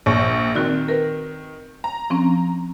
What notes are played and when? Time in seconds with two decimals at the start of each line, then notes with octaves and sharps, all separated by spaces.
0.06 A#1 C#6
0.55 D#3 C4 F#4 D5
0.88 A#4 B4
1.84 A#5
2.10 F3 C4 C#4